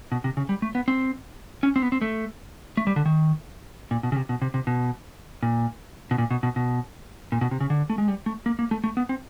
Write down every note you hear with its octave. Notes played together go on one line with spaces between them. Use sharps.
B2
C3
C#3
G3
A3
B3
C4
C#4
C4
B3
C4
A3
A3
G3
D3
D#3
A#2
B2
C#3
C3
B2
C3
C3
B2
A#2
B2
A#2
B2
B2
B2
A#2
B2
C3
C#3
D3
A3
G#3
G3
A3
A#3
A#3
A3
A3
B3
C4